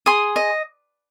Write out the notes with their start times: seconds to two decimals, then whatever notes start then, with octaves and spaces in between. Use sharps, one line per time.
0.06 G#4 C6 D#6
0.36 D#5